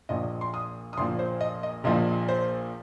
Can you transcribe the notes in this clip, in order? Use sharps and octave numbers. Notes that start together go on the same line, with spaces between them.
A#1 A#2 F3 D#5
C6
D#6
D#6
A#1 A#2 F3 C6
C5
D#5
D#5
A#1 A#2 F3 D#5
C5